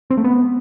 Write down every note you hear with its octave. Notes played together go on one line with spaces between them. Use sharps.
C4
A3
B3